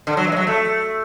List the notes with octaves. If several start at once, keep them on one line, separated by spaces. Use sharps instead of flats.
D3
F#3
E3
G#3
F#3
A3